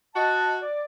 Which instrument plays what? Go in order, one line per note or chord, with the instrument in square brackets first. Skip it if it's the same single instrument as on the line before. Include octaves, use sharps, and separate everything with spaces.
[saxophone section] F#4 [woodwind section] D#5 A5
[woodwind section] D5